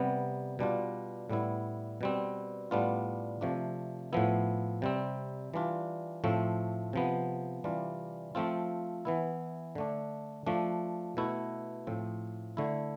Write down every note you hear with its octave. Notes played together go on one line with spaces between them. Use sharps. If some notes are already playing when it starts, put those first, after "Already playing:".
Already playing: C3 G3 B3
B2 G3 D4 F4
A2 G3 B3 E4
B2 G3 C4
A2 G3 B3 D4 F4
C3 F3 A3 D4
A2 F3 B3 E4
C3 G3 C4
E3 G3 D4 F4
A2 F3 A3 C4
C3 F3 B3
C3 E3 G3 D4 F4
F3 A3 C4 F4
E3 B3 E4
D3 A3 D4
F3 A3 D4
B2 A3 E4
A2 F3 C4
D3 A3 E4